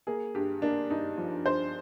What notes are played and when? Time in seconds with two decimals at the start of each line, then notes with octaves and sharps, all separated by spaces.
0.07 A#3 G#4
0.35 G2 G4
0.62 A#3 D4
0.90 G2 D#4
1.18 F3
1.45 G2 C5